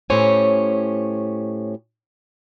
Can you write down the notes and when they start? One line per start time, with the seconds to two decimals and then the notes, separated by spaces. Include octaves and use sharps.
0.10 A2 C#4 G4 C5 C#5 G#5